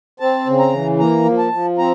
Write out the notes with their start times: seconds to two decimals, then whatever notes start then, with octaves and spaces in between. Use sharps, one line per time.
0.20 C4 A5
0.47 C#3
0.59 A#5
0.73 E3
0.99 A#3 A#5
1.25 F3
1.38 A5
1.52 F3
1.78 C4 A#5